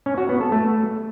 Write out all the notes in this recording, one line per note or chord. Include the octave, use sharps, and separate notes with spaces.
C#4
F#4
B3
A4
A3